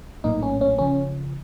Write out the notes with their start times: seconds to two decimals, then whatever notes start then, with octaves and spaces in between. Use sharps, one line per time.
0.24 A#1 A2 F#3 A#3 D#4
0.42 C#4
0.61 C#4
0.78 C#3 F3 C#4